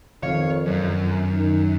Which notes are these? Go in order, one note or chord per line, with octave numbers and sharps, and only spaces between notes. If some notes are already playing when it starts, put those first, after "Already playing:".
F2 D#3 C#5 F5
F#2
D#3